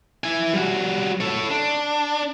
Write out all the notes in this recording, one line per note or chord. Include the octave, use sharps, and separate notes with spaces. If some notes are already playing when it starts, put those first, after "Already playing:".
E4 G#5
G3 F#4
A4 C#5
D4